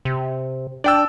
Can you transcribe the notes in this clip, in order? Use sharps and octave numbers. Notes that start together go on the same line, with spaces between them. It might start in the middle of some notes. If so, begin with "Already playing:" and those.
C3
D4 D5 G5 E6